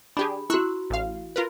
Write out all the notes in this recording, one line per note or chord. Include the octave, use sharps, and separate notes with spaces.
D4 G4 G#4 B5
E4 F#4 C#6 E6 F#6
A1 F5
F4 A#4 B4